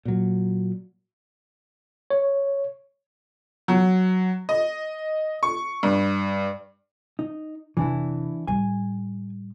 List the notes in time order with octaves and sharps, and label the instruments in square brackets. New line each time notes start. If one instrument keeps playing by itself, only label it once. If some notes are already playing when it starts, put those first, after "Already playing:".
[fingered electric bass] A#2 F#3
[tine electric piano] C#5
[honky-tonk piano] F#3
D#5
C#6
G2
[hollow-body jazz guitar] D#4
[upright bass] F1 [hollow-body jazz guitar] E3 D4 E4
[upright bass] A2 G3 [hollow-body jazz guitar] G#5